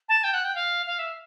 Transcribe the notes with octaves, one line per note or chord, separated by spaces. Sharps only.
A5
G5
F#5
G5
F5
F5
E5